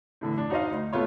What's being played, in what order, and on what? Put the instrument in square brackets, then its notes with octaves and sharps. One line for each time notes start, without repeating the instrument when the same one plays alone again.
[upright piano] A2 D3 E3
D4
D#4 F#4 C5 D#5 F5
D2
A3 B3 F4 C#5